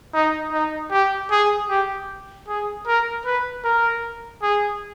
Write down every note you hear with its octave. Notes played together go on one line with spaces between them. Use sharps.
D#4
D#4
G4
G#4
G4
G#4
A#4
B4
A#4
G#4